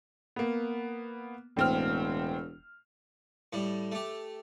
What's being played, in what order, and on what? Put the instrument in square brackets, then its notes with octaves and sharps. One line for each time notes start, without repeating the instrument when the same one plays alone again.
[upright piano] A#3 B3
[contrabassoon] E1 [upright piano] A2 C4 F6
[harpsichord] A2 G3
A3 G4